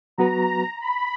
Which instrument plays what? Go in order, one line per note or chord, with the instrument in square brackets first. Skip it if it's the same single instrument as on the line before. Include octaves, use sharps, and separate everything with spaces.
[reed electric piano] F#3 B3 F#4 B4 [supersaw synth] A#5
[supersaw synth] B5